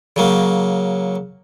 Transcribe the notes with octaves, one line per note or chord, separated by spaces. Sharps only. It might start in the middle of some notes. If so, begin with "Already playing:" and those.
C#3 F#3 A#3